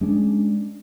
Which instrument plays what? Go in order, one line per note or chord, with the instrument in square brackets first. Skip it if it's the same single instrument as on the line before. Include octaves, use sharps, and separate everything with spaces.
[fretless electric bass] G#3 C#4 D4